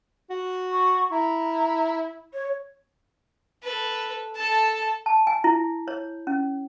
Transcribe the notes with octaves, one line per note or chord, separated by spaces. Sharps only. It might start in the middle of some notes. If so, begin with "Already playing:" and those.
F#4
C#6
E4 A#5
C#5
A4 B4
A4 A5
A5
G#5
E4
C#5
C#4